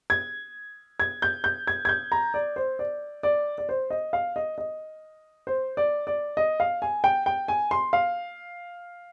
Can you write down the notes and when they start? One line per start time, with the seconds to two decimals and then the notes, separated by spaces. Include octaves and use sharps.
0.10 G#6
1.00 G#6
1.22 G6
1.44 G6
1.67 G#6
1.85 G#6
1.89 G6
2.12 A#5
2.34 D5
2.56 C5
2.79 D5
3.23 D5
3.58 D5
3.69 C5
3.90 D#5
4.13 F5
4.36 D#5
4.58 D#5
5.47 C5
5.77 D5
6.07 D5
6.37 D#5
6.60 F5
6.82 G#5
7.04 G5
7.26 G5
7.48 G#5
7.71 C6
7.93 F5